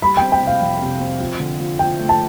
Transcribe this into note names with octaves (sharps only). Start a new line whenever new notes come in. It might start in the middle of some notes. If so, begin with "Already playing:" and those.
G3 B5
C4 G5
G5
C3
F5
F2
C3
C4
F3
D3
F3
F3 G5
A3
A5